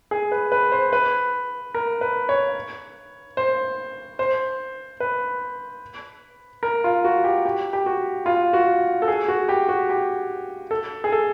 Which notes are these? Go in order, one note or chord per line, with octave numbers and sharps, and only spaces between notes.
G#4
B4
B4
C5
B4
A#4
B4
C#5
C5
C5
B4
A#4
F4
F#4
G4
G4
G4
F#4
F4
F#4
A4
G#4
F#4
G4
F#4
G4
A4
G#4
A4